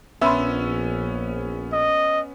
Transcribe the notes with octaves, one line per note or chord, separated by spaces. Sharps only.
A#1 B3 C#4 E5 B5 C6 E6
D#5